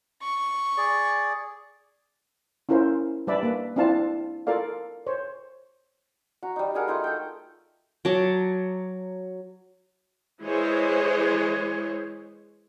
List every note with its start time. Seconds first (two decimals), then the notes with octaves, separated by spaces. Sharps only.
0.22 C#6
0.78 G#4 D5
2.69 C#4 E4 F4 A#4 C5
3.27 G3 D4 B4 D5 E5 B5
3.43 A#3 B4
3.76 C4 D4 E4 F4 F5 A5
4.47 F4 A4 A#4 D5 F5
5.07 C5 C#5
6.43 F#4 A#5
6.56 G3 D#4
6.74 D4 G#4 A#4 F#5
6.88 A3 D#4 F4
7.04 A4 G5
8.05 F#3 D5 A5
10.42 E3 G#3 G#4 C5 C#5